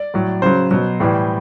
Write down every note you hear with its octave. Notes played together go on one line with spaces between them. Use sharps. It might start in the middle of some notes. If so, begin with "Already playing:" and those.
Already playing: D5
A2 F#3
C#3 F#3 C5
B2 F#3
A2 E3 G3